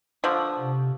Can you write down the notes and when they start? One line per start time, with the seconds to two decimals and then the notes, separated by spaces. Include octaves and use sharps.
0.24 D3 F3 C#6 D#6
0.59 C3